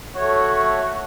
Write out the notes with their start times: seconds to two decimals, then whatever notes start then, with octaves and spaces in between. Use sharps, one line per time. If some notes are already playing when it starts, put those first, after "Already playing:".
0.16 A3 F#4 C#5